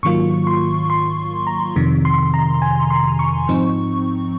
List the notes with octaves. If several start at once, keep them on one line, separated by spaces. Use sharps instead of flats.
G#2 D#3 F#3 A#3 F4 C#6
C6
C6
A#5
F2 C3 D#3
C6
A#5
G#5
C6
C#6
G#2 F3 C4 D#4